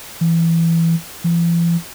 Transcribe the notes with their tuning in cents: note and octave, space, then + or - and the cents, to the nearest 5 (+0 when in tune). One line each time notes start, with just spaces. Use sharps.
E3 +10
E3 +45